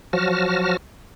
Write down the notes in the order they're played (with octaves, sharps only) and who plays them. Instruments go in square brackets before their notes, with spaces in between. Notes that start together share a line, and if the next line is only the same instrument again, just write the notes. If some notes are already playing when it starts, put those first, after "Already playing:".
[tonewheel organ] F3 F#3 F#4 A5 F6 A#6